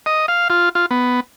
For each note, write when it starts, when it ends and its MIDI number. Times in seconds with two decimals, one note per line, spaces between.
0.06 0.26 75
0.28 0.48 77
0.50 0.69 65
0.75 0.86 65
0.91 1.20 59